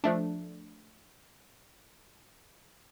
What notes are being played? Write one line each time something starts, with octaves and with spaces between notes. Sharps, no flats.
F3 A3 D4